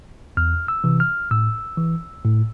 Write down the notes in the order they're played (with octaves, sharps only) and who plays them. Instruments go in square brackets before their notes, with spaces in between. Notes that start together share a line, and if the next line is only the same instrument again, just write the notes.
[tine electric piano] E2 F6
E6
C3 E3
F6
A2 E6
E3
A2